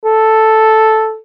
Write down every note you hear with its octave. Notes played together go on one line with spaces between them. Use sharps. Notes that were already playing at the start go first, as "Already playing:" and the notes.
A4